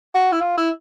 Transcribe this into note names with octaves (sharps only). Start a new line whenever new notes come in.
F#4
E4
F4
E4